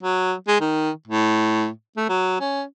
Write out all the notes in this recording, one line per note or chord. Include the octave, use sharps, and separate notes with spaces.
F#3
G#3
D#3
A2
A3
F#3
C#4